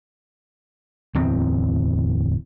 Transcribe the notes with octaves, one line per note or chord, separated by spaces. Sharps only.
D1 E2 C4